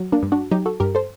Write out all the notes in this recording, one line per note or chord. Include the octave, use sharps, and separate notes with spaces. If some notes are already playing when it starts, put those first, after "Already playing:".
Already playing: F#3
A#3 D4
G2
D4 F#4
F#3 D#4 G4
F#4 A4
G2 G4 A#4
A4 C5